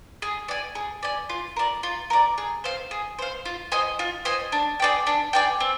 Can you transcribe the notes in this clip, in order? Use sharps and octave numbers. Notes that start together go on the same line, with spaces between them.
G#4
D5 G#5
G#4
D5 G#5
F4
A#4 D5
F4
A#4 D5
G#4
C5 F5
G#4
C5 F5
F4
C5 D#5 G#5
F4
C5 D#5 G#5
D4
G#4 D5 G5
D4
G#4 D5 G5
C4